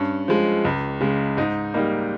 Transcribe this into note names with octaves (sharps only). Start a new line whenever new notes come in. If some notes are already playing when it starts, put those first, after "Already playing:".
Already playing: G2 C#4
F3 G#3
C#2
C#3 G#3
G#2 D#4
G3 A#3 D#4